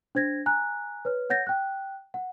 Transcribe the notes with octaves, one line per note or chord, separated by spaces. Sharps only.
D4 C5 G#6 A#6
G#5 A#5 F#6
B4 C#5 F6
C#5 F#5 G6 A6 A#6
G5 F#6
F#5